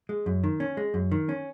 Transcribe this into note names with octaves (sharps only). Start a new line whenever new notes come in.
G#3
F#2
D#3
C#4
G#3
F#2
D#3
C#4